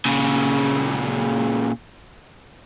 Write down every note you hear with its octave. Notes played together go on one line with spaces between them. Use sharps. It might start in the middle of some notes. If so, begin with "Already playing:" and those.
A#2 C#3